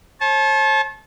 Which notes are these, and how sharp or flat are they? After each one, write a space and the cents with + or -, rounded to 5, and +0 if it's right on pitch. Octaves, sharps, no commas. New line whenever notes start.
C#5 -45 A5 -30